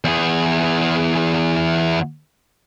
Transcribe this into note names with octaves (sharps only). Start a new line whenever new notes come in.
E2 G#4